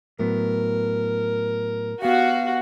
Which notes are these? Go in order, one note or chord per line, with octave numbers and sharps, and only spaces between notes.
A2 F#3 B3 A#4
B3 F#4 G4 F5